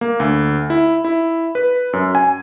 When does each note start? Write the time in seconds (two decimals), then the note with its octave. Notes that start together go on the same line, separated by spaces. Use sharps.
0.01 A#3
0.20 D2
0.70 E4
1.05 E4
1.55 B4
1.93 F#2
2.15 G#5